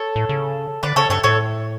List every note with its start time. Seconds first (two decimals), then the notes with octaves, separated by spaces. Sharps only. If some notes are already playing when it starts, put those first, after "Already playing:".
Already playing: A4 C#5
0.16 A2
0.29 C#3
0.83 D3 B4 D5
0.96 C#3 A4 C#5
1.10 G2 A4 C#5
1.23 A2 A4 C#5